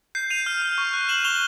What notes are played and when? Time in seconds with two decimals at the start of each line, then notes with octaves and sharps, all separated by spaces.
0.15 G6 C7
0.30 G6 D#7 F7
0.46 F6
0.62 F6
0.78 C#6
0.93 F#6
1.08 F#6 E7 F#7
1.24 C#6 F7 G7